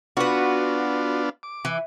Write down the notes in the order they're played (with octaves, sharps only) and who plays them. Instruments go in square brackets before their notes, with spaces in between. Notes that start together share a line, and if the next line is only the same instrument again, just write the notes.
[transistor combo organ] B3 D4 F4 [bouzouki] F#4 B4
[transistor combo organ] D6
[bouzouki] E3